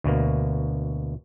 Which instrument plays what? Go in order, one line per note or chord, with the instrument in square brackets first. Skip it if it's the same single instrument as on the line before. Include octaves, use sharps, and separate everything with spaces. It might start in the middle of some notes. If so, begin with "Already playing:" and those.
[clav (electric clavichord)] D2 B2 A#3